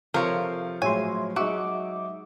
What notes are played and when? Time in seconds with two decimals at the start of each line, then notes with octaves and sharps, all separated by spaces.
0.14 C3 F3 A4 A#4 C#5 F5
0.82 A2 F#3 G#3 C#5 E5 G#5 C6
1.36 F#3 G#3 D#4 F#4 E5 D6